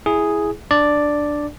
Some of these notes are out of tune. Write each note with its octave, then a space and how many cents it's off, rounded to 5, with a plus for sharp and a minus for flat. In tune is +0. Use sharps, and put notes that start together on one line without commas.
E4 +0 G#4 +0
D4 +5 D5 +0